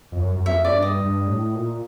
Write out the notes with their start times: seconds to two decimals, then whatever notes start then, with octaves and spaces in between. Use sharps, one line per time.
0.12 F2
0.18 F#2
0.35 F#2
0.46 F2 E5
0.65 F#2 D5
0.73 G2
0.82 D#5
1.00 G2
1.27 A2
1.55 A#2